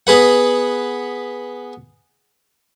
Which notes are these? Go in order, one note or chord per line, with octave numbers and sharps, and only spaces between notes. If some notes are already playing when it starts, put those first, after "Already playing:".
B3 G#4 B4 F#5